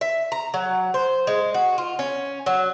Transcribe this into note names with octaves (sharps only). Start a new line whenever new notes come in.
E5
A#5
F#3
C5
G#3
F#4
F4
C#4
F#3